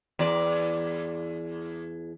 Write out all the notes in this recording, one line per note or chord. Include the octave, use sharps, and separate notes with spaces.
E2 D5